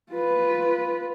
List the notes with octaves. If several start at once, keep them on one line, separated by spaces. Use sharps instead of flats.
F4 B4